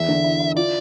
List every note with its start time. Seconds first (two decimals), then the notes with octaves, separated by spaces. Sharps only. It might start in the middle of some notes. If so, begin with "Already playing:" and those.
Already playing: E2 E5
0.08 D3
0.24 E4
0.40 E4
0.57 F4 D5